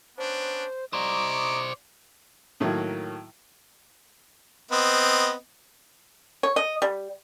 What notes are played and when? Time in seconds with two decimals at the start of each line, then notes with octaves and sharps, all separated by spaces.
0.18 B3 C#4 D4 C5
0.93 C5 D5 D#5 A#5 C#6 D6
2.60 A2 D#3 F#3 A#3
4.71 B3 C4 D#5
6.43 C#5
6.56 D#5
6.82 G3